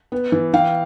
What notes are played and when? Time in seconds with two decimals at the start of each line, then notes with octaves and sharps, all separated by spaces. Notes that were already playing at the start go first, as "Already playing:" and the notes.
0.12 B3
0.32 E3
0.53 E3 F5 G5